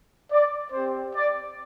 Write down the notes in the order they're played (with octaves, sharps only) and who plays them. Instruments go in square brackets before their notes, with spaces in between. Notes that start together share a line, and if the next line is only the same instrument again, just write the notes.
[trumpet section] D5
C4 G4 C5
D5